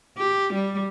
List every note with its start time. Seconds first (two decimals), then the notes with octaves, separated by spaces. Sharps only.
0.18 G4
0.54 G3